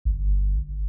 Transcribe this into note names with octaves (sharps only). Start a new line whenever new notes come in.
G1